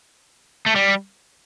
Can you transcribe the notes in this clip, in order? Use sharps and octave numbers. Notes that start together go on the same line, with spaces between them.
A3
G3